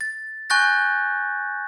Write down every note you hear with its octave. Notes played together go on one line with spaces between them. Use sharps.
A6
G#5 C#6 F#6 G6 A6 A#6